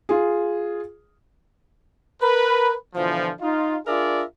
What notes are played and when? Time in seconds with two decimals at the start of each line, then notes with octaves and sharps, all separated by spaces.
0.09 F4 G#4
2.21 A#4 B4
2.95 B2 D3 E3 F3
3.41 D#4 F4
3.87 D4 F4 G#4 A#4 D5 E5